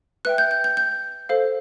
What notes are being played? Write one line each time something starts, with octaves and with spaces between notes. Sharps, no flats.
B4 E5 G5 F#6
G6
G6
G6
G6
A4 C5 F5